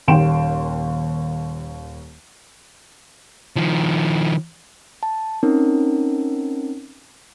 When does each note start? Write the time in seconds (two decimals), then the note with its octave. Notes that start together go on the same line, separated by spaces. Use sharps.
0.08 D#1 D#2 G5 C6 D7 E7
3.56 D#3 F3
5.03 A5
5.43 C4 C#4 D#4 A#4